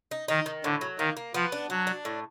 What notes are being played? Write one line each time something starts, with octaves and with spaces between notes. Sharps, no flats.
D#4
D#3 D#4
D#3
A2 D3
F#3
D#3 A#3
A#3
F3 B3
D4
F#3 D4
D4
A2